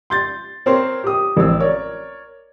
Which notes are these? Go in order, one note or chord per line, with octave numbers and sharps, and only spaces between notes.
C6 G6 A6
C4 A#4 C5 C#5 C6
G4 D#6
A1 C4 E6
A#4 C#5 D5